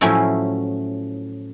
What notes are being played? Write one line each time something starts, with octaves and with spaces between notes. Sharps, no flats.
A2 F3 F#3 C#4 E4